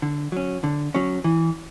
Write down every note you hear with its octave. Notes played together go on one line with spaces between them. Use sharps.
D3
F#3 C#4
D3
F#3 C#4
E3